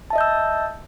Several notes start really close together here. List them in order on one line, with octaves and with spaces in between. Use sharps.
A5 E5 D#5 G6 E6